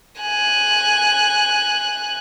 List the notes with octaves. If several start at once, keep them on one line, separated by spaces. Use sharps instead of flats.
G#5 F#6